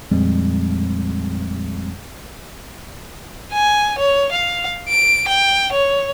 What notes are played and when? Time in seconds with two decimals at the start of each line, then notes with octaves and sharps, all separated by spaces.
0.11 F2 A#2 F3 G3 G#3 C4
3.53 G#5
3.99 C#5
4.32 F5
4.89 D7
5.28 G5
5.73 C#5